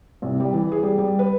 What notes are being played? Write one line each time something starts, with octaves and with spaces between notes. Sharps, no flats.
C2
G3
E3
G#4
G3
G3
B4